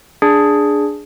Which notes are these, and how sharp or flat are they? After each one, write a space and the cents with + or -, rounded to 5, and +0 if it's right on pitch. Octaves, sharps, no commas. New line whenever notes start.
D4 +0 G#4 +0